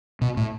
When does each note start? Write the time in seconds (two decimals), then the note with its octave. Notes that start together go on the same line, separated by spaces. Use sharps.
0.21 B2
0.37 A2